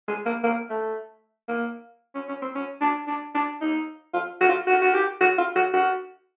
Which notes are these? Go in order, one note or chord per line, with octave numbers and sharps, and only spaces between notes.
G#3
A#3
A#3
A3
A#3
C#4
C#4
C4
C#4
D4
D4
D4
D#4
F4
F#4
F4
F#4
F#4
G4
F#4
F4
F#4
F#4